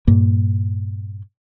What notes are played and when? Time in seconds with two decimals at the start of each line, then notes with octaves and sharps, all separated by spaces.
0.07 G2 A#2 A#3